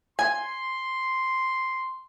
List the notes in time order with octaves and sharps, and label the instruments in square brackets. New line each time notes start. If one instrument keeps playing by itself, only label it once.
[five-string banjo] G#5 [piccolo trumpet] C6